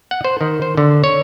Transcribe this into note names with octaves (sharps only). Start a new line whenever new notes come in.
F#5
C5
D#3
C5
D3
C#5